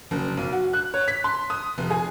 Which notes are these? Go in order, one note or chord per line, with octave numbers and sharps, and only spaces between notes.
F#1
B1
F#4
F#6
C#5
B6
C6
D#6
F1
G#4